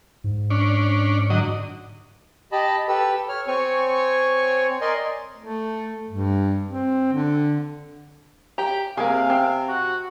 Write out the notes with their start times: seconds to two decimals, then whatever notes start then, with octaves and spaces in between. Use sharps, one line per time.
0.24 G#2
0.50 C#4 D4
1.30 D3 F#3 D#5
2.52 G4 D#5 A5 B5
2.88 G4 A4 B4 E6
3.29 C#5 F6
3.47 C4 C#5 G#5 C#6
4.81 A#4 D5 D#5 G#5 C6
5.37 A3
6.10 G2
6.67 C4
7.13 D3
8.58 G4 A#5
8.97 C3 A#3 G#4 F5
9.30 C4
9.68 F#4